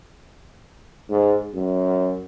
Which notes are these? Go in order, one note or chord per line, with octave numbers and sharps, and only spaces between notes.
G#2
F#2